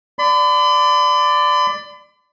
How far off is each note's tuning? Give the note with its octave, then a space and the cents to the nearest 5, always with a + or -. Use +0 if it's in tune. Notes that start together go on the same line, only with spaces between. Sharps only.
D5 +0 B5 +45